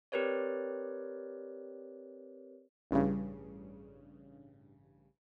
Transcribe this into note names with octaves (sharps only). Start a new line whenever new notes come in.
C4 G4 A#4 B4 C#5 D5
A1 G2 C#3